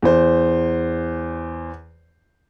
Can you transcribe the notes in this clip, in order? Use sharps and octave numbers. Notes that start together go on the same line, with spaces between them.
E2 C5